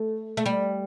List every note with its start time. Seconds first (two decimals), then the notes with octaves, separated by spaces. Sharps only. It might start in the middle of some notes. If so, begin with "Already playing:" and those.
Already playing: A3
0.37 A3
0.46 G3